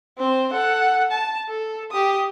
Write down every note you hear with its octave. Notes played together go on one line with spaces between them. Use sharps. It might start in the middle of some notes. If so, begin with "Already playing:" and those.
C4 C5
A4 F#5
A5
A4
G4 D#6